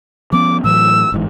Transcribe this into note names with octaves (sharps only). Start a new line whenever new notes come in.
F3 B3 C#4 D6
A2 E3 F#3 E6
G1 G#2 E3